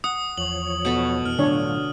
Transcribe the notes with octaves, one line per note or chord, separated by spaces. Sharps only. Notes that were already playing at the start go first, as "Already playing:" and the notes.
F#5 D#6
E2 F3 C#5 F#7
B2 A4 B5
F2 E3 B3 F6
A2 D3 F#3 D4 F4 C#5